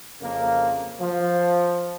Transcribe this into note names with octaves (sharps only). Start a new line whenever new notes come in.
F2 C#3 A#3
F3